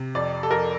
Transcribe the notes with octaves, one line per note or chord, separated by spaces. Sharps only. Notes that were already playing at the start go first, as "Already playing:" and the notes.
Already playing: C3
F2 D5
A4
F2 A#4